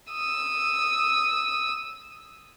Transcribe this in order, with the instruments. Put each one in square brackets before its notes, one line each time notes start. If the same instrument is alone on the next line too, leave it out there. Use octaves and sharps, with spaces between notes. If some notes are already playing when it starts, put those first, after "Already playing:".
[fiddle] D#6 E6